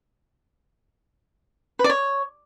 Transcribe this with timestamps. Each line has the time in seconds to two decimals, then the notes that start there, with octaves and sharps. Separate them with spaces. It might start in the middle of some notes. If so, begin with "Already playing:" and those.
1.79 B4
1.84 D5
1.90 C#5